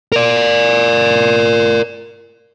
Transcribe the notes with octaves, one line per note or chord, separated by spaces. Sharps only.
A#4 D5